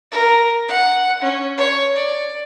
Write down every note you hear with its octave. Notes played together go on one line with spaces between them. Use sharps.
A#4
F#5
C#4
C#5
D5